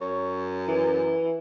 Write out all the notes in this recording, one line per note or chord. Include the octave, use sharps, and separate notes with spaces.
F#2 C#5
E3